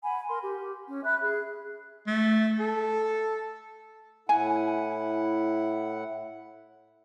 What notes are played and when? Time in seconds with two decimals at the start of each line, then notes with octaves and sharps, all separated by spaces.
0.04 F#5 G#5 B5
0.28 A#4 C6
0.43 G4
0.88 C#4
1.04 E5 B5 F#6
1.20 G#4
2.07 A3
2.59 A4
4.29 A2 E4 F#5 G#5